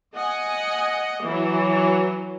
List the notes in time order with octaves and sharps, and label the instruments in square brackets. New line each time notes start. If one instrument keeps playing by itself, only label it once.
[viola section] D#5 F#5 G#5
E3 F#3